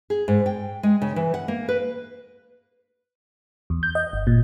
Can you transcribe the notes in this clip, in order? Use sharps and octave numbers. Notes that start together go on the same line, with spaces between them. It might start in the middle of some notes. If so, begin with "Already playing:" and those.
G#4
G#2
G5
G#3
C#3
E3
F#5
A#3
B4
E2
G6
D#5
G1
A#2